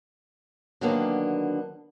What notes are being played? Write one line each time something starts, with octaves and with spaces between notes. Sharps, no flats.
D3 D#3 F#3 A#3 B3 D4